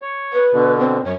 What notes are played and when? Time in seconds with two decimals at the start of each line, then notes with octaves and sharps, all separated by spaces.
0.02 C#5
0.33 B4
0.53 B2 D3
0.79 C4
1.05 F#2 C#5